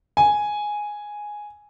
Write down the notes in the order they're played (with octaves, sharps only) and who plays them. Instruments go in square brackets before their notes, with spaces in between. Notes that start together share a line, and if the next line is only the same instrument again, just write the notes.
[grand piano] G#5